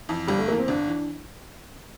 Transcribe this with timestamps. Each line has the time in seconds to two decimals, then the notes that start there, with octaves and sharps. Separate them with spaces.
0.09 F2 E3
0.27 G1 G3
0.39 A3
0.48 F2 E3 A#3
0.59 C4
0.68 G1 D4
0.88 E3